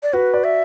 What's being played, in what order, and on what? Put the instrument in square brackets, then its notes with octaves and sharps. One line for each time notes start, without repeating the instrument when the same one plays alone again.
[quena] D5
[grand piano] F#4 [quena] B4
[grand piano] D5
[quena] E5